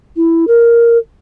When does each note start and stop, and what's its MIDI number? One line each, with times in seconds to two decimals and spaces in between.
0.16 0.45 64
0.48 0.98 70